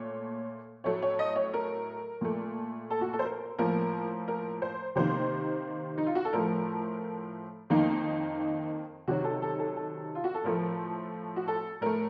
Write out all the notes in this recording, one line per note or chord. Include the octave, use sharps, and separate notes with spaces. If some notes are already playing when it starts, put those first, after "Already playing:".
Already playing: A#2 A3 C#5
A2 F#3 A3 C#5
C#5
D#5
C#5
A#4
A#2 A3
A4
F#4
A4
C5
A#4
A2 F3 A#3 A#4
A#4
C5
C3 D#3 A#3 C5
D#4
F4
F#4
A4
A2 F3 A3 A#4
F2 D#3 A#3 D#4
C3 D#3 F#3 F#4
A4
A4
A4
A4
F4
F#4
A4
A2 F3 A3 A#4
F#4
A4
A2 A3 A#4